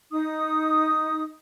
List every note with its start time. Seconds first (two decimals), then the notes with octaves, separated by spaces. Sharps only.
0.11 D#4 D#6